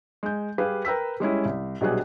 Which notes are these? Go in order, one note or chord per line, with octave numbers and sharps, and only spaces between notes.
G#3 G6
G3 G4 G#4 B4 F5
A#4 B4 G5 E6 B6
G3 G#3 C#4 E4
C2
A#1 B2 F#3 G3 G#4 F#6